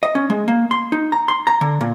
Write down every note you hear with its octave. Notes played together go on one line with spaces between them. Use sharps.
D#5
C#4
G#3
A#3
C6
D#4
A#5
C6
A#5
D3
A#2